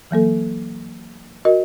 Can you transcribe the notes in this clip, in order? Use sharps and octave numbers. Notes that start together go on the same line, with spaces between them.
E3 F#3 A#3 A4
F#4 A#4 D#5